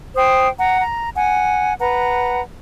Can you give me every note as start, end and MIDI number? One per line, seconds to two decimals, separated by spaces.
0.15 0.48 72
0.15 0.48 79
0.15 0.48 87
0.58 0.80 78
0.58 0.80 82
0.81 1.08 82
1.15 1.73 78
1.15 1.73 80
1.79 2.41 71
1.79 2.41 78
1.79 2.41 82